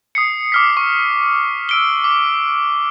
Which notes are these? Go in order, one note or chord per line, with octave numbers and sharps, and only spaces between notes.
D#6 C7 C#7
D6 F6 B6
C#6
E6 D7 G7
D6